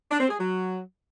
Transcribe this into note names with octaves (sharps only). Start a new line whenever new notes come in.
D4
C4
G#4
F#3